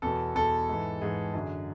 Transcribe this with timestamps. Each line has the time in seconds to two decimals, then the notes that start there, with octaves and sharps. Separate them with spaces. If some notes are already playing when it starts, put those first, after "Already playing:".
0.02 E2 B2 A4
0.35 E2 B2 A4
0.69 G#2 E3
1.01 G#2 E3 G#4
1.34 F#2 D3